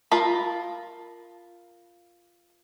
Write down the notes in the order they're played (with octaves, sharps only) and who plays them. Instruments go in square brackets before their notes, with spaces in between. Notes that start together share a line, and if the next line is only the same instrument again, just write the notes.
[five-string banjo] F4 A#4 A5 B5